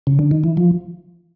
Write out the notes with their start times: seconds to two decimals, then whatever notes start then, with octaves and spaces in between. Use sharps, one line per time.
0.07 C#3
0.19 D3
0.31 D#3
0.44 E3
0.57 F3